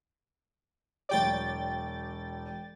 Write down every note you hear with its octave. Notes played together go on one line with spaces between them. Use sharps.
E1 F#3 C#5 D5 G5 A6